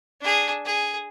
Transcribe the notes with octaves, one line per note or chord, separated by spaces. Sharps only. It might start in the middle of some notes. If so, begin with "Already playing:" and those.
D4 G#4
G#4